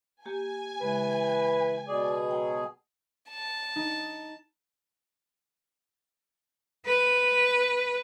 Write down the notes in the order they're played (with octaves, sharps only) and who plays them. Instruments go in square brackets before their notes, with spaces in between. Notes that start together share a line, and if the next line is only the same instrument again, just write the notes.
[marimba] A#3 G4 [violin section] G#5
[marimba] C#3 G#3 [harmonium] E3 [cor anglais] B4
[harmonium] B2 G#4 [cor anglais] D5
[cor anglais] F#3 [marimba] G5
[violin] A5
[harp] D#4
[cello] B4